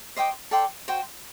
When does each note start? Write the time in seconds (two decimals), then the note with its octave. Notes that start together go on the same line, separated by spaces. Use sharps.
0.17 C5 D#5 G5 D6
0.51 A4 D5 G5 C6
0.88 F#4 C5 G5